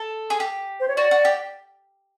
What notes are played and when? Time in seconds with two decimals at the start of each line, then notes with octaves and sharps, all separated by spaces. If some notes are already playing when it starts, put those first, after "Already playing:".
Already playing: A4
0.30 G#4
0.40 G4
0.80 C5
0.88 C#5
0.96 F#4 D5
1.11 F#4
1.25 G4